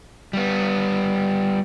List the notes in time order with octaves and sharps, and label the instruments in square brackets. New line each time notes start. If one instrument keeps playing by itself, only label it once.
[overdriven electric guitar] G3 B3